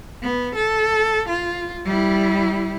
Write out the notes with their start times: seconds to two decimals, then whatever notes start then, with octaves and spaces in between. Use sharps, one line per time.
0.22 B3
0.55 A4
1.29 F4
1.85 G3 E4